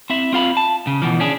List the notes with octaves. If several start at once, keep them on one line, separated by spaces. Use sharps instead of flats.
C4 E4 E5
C4 F4 F5 B5
A5
C#3
B2 E3 F3
C#4 D4 G#4